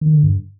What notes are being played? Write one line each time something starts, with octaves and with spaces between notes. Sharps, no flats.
D#3
D3
G2